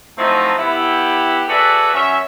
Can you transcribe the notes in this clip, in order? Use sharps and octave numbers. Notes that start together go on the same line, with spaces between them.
F3 F#3 A3 C4 D#4 E4
B3 E4 G4
F#4 G#4 A4 B4 D5 E5
F#2 C#4 E5